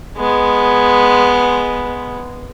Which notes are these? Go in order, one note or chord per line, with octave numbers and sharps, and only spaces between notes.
G#3 B3